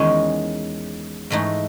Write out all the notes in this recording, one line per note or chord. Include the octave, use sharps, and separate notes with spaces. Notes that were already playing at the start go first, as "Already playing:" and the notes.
Already playing: E2 D#3 G#3 C#4 G#4
G#2 E3 A3 D#4